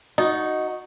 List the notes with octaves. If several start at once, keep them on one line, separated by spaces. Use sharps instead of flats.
D#4 F#4 D#5